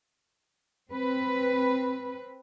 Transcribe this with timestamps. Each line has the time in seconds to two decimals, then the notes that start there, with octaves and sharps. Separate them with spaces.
0.90 C4 B4